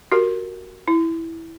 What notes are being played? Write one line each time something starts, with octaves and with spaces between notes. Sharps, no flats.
F#4 G4 A#4
E4